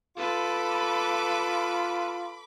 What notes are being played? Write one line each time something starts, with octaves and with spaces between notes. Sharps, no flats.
F4 A4 B4 B5 D6